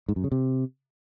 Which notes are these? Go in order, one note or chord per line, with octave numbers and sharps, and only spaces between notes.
G#2
F#2
C#3
C3